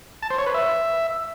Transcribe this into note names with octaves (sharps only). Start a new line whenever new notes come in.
A5
C5
C#5
B4
E5